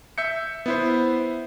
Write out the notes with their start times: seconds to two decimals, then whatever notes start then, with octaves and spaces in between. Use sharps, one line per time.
0.18 E5 G6 C#7
0.66 B3 E4 C5